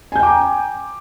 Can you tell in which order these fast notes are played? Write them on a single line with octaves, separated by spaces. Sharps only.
G#5 G6 G5 D6 A#5